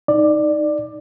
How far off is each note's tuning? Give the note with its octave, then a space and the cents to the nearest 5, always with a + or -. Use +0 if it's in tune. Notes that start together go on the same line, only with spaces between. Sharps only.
D#4 +0 D5 +15